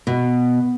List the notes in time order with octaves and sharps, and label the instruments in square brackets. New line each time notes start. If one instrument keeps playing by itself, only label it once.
[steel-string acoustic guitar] B2